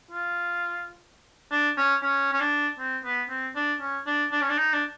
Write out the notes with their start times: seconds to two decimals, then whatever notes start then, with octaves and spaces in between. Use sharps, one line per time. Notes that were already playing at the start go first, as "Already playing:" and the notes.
0.11 F4
1.51 D4
1.77 C#4
2.02 C#4
2.33 C#4
2.40 D4
2.79 C4
3.04 B3
3.30 C4
3.55 D4
3.81 C#4
4.06 D4
4.32 D4
4.41 C#4
4.50 D4
4.57 D#4
4.73 D4